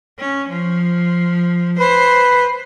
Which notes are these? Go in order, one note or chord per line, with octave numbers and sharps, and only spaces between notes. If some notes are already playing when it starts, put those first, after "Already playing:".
C#4
F3
B4 C5